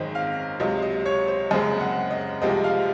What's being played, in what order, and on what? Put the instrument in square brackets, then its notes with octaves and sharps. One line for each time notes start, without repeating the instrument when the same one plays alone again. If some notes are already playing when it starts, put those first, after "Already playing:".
Already playing: [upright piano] G#1 F#2 D#3 G#3 C4 D#5
F5
C#2 C3 F#3 D#5
D#5
C#5
C5
F#1 F#2 C#3 G#3 C4 D#5
F#5
D#5
C2 C3 F3 G#3 C4 D#5
F5